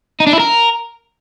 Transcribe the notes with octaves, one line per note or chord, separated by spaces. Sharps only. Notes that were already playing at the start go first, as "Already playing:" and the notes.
D#4
D4
E4
A#4